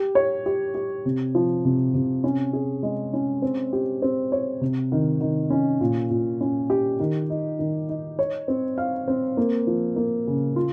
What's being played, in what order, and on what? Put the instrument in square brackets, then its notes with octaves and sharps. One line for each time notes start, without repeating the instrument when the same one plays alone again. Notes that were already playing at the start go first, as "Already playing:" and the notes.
Already playing: [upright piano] G4
C#5
G4
G4
C3
F3
C3
C3
C#4
G#4
G#3
C#4
C4
G4
C4
C#5
C3
D#3
D#3
C#4
A#2
A#2
C#4
G4
D#3
D#4
D#3
D#4
C#5
C4
F5
C4
A#3
F3
A#3
C#3
F4